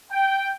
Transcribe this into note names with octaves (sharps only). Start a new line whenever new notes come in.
G5